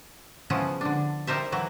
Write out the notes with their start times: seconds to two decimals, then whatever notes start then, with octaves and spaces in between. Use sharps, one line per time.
0.50 C#3 F3 B3 C#4 E4
0.81 D3 D4
1.27 G3 D#4 A#4 C5 E5
1.52 E3 F#3 E4